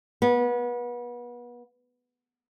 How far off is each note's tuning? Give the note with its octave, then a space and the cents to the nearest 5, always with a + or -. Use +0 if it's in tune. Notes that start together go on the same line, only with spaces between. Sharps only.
B3 -30